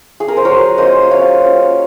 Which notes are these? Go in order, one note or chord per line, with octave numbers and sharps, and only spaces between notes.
G#4
A#4
C5
F#3 A#4 C#5
A#3 C#4 F4 C5 D#5
F#3 C#5 F5
A#3 C#4 F4